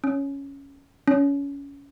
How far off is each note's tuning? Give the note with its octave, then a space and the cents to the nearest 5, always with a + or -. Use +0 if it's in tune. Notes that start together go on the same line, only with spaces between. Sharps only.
C#4 +0
C#4 +20